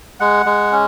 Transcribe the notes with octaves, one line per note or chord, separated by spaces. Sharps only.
G#3 F#5
G#3
C#4